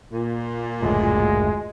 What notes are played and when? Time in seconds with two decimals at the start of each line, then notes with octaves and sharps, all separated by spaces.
0.12 A#2
0.83 F#1 D2 A2 G#3